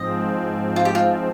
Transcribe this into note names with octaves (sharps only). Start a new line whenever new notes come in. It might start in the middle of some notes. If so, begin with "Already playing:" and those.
Already playing: G#2 F3 C4 D#5
F4
G4
F4